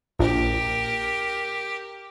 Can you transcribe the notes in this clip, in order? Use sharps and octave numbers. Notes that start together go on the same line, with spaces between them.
A#1 G4 A#4